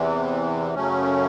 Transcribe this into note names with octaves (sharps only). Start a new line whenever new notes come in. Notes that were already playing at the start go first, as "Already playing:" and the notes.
Already playing: E2 C3 E3
F#2 C#3 F#3 A3 C#4